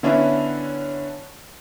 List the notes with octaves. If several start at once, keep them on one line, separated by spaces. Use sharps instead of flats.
D3 B3 C#4 D4 E4